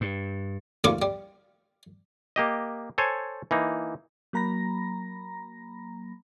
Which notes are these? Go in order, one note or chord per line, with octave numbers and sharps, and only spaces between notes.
G2
A1 D2 A#3 F4 C#6 D6
G3
A#3 G4 D#5
A4 C5 C#5 G#5
E3 A#3 D#4
F#3 A#3 A#5 B5 A#6